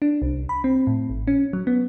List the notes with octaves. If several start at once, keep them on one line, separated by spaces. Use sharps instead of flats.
D4
C2
B5
C4
A2
G#1
C#4
F#3
B3